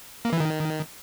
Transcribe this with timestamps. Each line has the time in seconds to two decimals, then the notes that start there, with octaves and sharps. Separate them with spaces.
0.25 A#3
0.33 E3
0.40 D#3